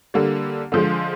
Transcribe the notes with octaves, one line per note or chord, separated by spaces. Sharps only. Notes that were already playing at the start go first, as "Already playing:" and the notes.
D3 G3 A#3
D3 F3 G#3